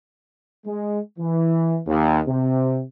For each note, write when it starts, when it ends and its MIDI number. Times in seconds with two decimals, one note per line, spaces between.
0.67 1.00 56
1.19 1.79 52
1.87 2.21 39
2.28 2.81 48